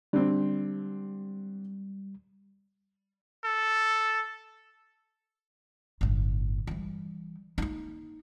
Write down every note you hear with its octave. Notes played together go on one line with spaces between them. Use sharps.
D3 G3 C4
A4
G1 A2
E3 G3
A#3 D#4